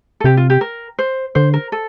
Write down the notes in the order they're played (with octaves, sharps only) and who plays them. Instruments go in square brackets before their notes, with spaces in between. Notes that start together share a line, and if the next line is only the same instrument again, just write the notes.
[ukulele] A4
[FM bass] C3 [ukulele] G4
[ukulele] F4
G4
A#4
C5
[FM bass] D3 [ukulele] C5
[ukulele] A#4
A4